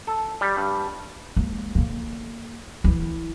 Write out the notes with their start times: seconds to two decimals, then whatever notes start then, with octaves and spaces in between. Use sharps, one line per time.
0.07 A4
0.41 G3
0.57 G2
1.36 G#3 A#3
1.75 D3 A#3
2.84 E3 E4